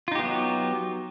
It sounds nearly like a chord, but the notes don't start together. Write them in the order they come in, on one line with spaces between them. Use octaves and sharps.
F4 D#4 G4 B3 F#3